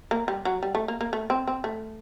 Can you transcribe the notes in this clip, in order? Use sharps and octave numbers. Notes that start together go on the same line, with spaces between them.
A#3
G3
F#3
G3
A3
A#3
A#3
A3
C4
C4
A3